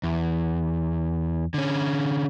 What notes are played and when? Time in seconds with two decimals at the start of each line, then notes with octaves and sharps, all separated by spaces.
0.03 E2
1.54 D3 C#4